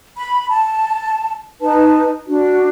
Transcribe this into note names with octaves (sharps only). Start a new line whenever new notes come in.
B5
A5
D#4 B4 A5
D4 F#4